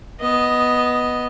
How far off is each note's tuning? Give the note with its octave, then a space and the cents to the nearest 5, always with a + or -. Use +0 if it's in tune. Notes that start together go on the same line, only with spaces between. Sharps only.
B3 +0 D#5 +0